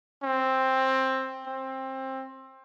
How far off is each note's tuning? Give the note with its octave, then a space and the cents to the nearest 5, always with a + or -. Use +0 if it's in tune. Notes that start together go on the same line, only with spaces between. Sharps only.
C4 +10
C4 +20